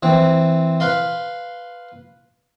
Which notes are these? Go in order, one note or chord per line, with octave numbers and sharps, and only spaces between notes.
E3 C4
B4 F5 C6